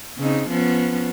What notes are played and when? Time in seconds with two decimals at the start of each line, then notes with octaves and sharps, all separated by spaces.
0.18 C#3 C4 D#4
0.49 F3 B3 C#4